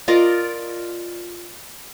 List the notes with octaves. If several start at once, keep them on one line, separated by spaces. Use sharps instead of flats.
F4 A#4 D5 D#5